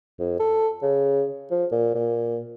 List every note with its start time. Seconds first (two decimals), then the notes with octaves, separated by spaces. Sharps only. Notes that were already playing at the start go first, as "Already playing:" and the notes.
0.19 F2
0.40 A4
0.83 C#3
1.51 F3
1.72 A#2
1.95 A#2